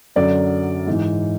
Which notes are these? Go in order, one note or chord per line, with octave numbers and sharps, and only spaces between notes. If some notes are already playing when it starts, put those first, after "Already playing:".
F#2 D3 F#3 D5
G#2 E3